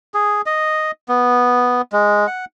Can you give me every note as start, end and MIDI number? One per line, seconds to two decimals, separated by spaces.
0.14 0.42 68
0.46 0.91 75
1.09 1.82 59
1.93 2.27 56
2.27 2.45 78